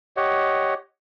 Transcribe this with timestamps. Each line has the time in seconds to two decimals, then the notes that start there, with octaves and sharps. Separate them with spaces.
0.17 G4 C#5 D#5 F#5